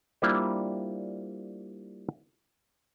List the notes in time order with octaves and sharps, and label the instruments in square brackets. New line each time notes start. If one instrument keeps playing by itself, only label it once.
[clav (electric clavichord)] G3 A#3 D4 E4 F4 C5